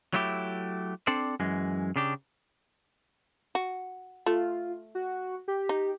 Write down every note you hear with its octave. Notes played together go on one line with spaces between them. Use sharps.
F#3 A3 E4 G4
C4 D4 A4 C5 D5
F#2 E3 G#3
C#3 D4 G4
F#4
A3 F4
F#4
G4
D#4